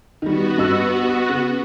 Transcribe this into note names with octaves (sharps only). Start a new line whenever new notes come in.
D#3 G3 B3 F#4
G2 D#5 E6
C#3